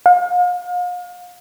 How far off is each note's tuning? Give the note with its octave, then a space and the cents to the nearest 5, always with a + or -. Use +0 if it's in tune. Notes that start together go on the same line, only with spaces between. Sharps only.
F5 +40